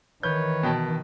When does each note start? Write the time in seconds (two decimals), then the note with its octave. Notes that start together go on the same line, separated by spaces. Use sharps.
0.23 D#3 E3 B4 C#5 G6
0.63 B2 G5 A5